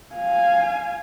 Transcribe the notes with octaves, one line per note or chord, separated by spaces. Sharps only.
F5 G#5